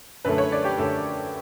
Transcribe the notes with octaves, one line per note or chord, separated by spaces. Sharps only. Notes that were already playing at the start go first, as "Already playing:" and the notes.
F#2 D3 A3 B4
C#5
D5
G4
F#2 D3 A3 A4